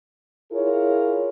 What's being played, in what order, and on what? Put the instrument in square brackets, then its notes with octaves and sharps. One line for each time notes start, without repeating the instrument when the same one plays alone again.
[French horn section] E4 F4 G#4 A#4 C#5